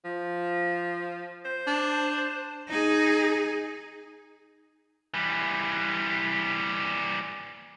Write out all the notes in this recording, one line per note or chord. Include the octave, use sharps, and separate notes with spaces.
F3
C5
D4
D#4 G#4
E3 G3